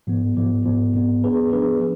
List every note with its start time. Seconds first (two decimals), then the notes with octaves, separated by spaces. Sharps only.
0.07 G#2 F3 B3
0.37 G#2 F3 B3
0.66 G#2 F3 B3
0.94 G#2 F3 B3
1.24 F3 B3 D4 G#4 B4
1.53 F3 B3 D4 G#4 B4